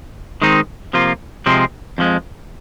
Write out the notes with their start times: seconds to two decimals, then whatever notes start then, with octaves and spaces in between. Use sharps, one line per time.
0.42 D#3 G#3 C4 D#4
0.93 C3 F3 A#3 F4
1.46 C3 F3 G#3 C4
1.98 F2 F3 G#3